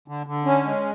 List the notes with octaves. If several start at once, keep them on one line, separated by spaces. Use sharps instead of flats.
D3
D3
C#4
G#3